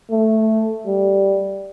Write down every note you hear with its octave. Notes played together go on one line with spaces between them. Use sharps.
A3
G3